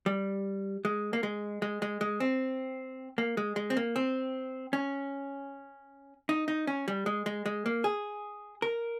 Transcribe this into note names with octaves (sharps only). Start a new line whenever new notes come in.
G3
G#3
A#3
G#3
G#3
G#3
G#3
C4
A#3
G#3
G#3
C4
A#3
C4
C#4
D#4
D#4
C#4
G3
G#3
G#3
G#3
A#3
G#4
A#4